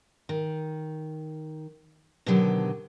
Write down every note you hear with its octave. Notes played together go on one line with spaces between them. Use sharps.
D#3
B2 D3 D#3 F#3 G4